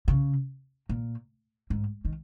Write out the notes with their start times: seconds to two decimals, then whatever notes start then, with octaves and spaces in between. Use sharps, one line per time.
0.08 C#3
0.89 A#2
1.70 G#2
2.05 D#3